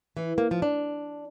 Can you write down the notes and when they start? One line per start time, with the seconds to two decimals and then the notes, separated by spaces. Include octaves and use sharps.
0.17 E3
0.38 A#3
0.51 F3
0.62 D4